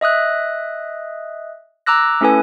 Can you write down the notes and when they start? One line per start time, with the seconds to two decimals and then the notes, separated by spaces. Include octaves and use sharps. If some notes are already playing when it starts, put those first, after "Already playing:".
0.01 D#5 E5 D#6 F#6
1.86 A#5 D6 E6 F#6 A#6
2.21 A3 C#4 E4 A4 B4 G#5